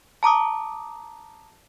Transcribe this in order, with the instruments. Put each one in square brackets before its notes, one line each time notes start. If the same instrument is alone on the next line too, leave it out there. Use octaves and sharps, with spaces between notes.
[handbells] A5 A#5 D6 D#6